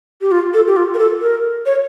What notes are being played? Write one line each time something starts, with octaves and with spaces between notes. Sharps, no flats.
G4
F4
A4
G4
F4
A#4
A4
A#4
C#5